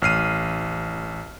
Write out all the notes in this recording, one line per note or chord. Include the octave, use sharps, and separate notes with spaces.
A1 F6 C7 D#7